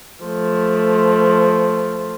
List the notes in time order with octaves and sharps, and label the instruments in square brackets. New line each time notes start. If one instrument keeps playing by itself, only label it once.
[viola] F3 A3